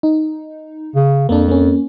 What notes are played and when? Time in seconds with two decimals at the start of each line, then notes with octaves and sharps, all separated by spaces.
0.03 D#4
0.96 C#3
1.29 F2 A#3 D4
1.48 A#3 C#4